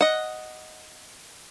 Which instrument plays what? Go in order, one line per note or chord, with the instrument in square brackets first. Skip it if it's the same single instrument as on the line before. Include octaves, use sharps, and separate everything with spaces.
[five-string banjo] D#5 F#5